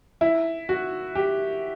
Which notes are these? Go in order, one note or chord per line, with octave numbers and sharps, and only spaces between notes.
E4
F#4
G4